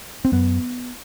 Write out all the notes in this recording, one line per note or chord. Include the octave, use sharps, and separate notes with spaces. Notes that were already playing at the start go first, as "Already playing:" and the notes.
C4
F#2 B3